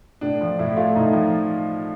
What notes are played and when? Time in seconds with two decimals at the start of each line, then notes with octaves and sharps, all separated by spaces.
0.21 A2 D4
0.41 F3
0.59 A2 E4
0.77 A3 F4
0.96 A2 D#4
1.13 F3